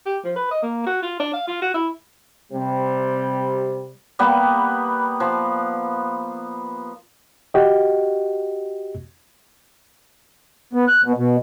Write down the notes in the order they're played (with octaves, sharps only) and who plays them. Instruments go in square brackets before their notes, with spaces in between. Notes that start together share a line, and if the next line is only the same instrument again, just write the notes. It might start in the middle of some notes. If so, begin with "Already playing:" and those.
[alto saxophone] G4
F3
B4
D#5
A#3
F#4
F4
D4
F5
F4
F#4
E4
[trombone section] C3 G3
[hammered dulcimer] G3 A#3 B3 G4
F3
[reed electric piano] F#4 G4 D#5
[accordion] B3
F#6
B2
B2